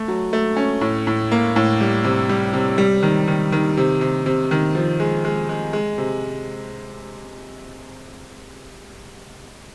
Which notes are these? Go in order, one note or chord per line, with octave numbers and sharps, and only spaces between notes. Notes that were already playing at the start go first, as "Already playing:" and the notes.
Already playing: A3
F#3
A3
C#4
A2
A2
A#3
A2
G3
C3
G3
C3
G3
D#3
D#3
D#3
C3
C3
C3
D#3
F3
G#3
G#3
G#3
G#3
C3